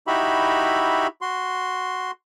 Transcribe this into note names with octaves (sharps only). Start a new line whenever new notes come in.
D#4 E4 F#4 G4 E5 B5
F#4 C6